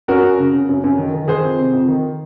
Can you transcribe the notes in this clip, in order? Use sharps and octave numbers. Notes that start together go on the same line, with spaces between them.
F#2 F#4 A#4
F#2
C#3
C#3
F#2
F#2
D#3
D#3
D#3 G#4 C5
F2
C3
F2
D#3